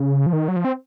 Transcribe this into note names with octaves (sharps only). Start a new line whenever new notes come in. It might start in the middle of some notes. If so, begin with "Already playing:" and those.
Already playing: C#3
F3
D#3
F#3
F3
C4